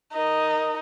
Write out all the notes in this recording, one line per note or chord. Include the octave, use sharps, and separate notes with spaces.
D#4 A#4 D#5